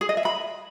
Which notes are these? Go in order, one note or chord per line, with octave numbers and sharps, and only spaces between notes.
G#4
D#5
E5
B5